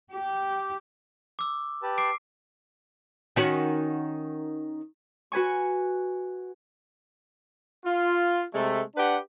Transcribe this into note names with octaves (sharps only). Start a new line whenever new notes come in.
G4
D6 E6
G4 B4 A5
D6 C7 D7
D#3 C#4 F#4
F#4 B4 G#5 C#6
F4
C3 G#3 A3
D4 G4 B4 F#5